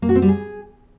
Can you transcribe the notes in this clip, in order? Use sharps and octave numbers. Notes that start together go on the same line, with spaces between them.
A#3
F#4
C4
G3
G#4